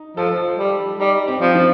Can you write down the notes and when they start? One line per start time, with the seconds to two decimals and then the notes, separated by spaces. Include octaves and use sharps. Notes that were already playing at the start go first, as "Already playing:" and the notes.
Already playing: D#4
0.17 F3 A4
0.58 G3
1.00 G3 D#4
1.28 C4
1.41 F3
1.55 F3